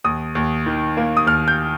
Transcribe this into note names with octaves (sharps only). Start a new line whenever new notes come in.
D#2 D#6
D#2
D#3
A#3
D#6
D#2 F6
G6